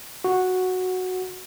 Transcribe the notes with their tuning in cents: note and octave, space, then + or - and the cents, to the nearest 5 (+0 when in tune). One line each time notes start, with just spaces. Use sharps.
F#4 -5